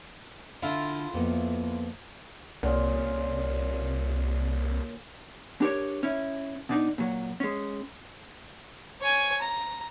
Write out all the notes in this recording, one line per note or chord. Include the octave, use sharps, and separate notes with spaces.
D3 E4 F4
F2 A#3 B3
C2 A#2 C#3
D4 G4 A#4 C#5
C#4 E4
B2 D4 D#4
A#2 F#3
G#3 C#4
C#5 G#5
A#5